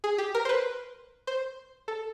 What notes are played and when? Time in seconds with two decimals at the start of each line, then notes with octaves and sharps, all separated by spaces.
0.04 G#4
0.18 G4
0.35 A#4
0.45 C5
0.49 B4
1.27 C5
1.88 A4